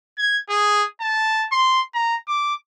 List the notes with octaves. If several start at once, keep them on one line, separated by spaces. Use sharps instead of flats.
G#6
G#4
A5
C6
A#5
D6